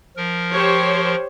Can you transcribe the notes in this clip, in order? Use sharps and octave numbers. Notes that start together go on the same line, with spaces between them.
F3 A#4
G4 C5 C#5